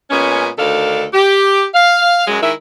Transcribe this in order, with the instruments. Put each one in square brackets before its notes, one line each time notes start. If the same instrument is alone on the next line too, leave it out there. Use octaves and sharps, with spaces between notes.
[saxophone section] A#2 G#3 B3 C#4
D2 D#3 D4 A4 F5
G4
F5
F#2 F#3 G#3
D#3 G#3 E4 E5